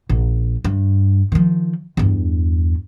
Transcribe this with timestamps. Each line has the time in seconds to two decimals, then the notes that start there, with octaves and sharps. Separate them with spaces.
0.09 A#1
0.64 G2
1.32 D#3 F3
1.97 E2 G2